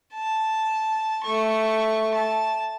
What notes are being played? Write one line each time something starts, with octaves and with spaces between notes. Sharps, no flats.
A5
A3 C#6
A5